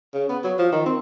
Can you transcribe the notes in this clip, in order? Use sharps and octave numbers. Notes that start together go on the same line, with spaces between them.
C#3
B3
F#3
F3
D#3
C4